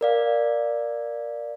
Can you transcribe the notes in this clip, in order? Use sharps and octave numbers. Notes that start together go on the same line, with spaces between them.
A#4 D5 F5